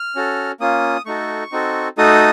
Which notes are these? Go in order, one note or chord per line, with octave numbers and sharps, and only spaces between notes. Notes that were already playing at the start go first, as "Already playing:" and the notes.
Already playing: F6
C#4 F#4 A4
A#3 C#4 F4 D#6
A3 D#4 F#4 A4 C#6
C4 D#4 F#4 A4
A3 D#4 F#4 A4 D#6